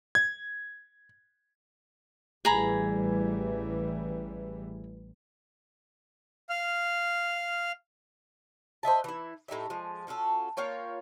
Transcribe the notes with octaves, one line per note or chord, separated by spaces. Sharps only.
G#6
A1 E3 G3 G#4 A#5 B5
F5 F6
C5 D#5 E5 A5
E3 E4
A2 D#4 G4 E5
F3 G#3
C#4 F4 F#4 A4
A#3 F4 C#5 G5